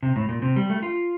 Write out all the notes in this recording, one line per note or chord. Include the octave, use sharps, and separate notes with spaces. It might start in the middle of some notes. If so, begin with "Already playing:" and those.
C3
A2
A#2
C3
G3
A3
F4